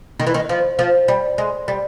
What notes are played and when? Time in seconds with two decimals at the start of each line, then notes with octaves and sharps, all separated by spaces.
0.20 D#3
0.27 E3
0.34 D#3
0.49 F3
0.79 F3
1.08 G3
1.38 G#3
1.68 G3